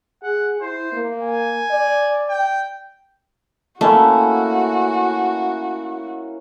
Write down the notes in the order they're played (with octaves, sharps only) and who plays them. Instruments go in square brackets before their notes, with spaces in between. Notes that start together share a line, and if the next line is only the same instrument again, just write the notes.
[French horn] G#4 [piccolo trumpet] F#5
[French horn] E4 [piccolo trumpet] C5
[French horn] A#3
[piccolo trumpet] G#5
[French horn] D5
[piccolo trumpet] G5
[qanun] A3 [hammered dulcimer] A#3 C#4 E4 [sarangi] F#4